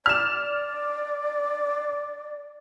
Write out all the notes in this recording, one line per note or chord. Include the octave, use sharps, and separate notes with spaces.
D5 F6 E7